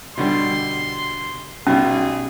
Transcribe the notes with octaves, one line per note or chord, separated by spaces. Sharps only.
B2 D3 G3 C6
B1 B2 G3 C#4 G#4